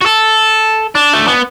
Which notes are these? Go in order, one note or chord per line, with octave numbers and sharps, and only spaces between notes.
F#4
A4
D4
A3
B3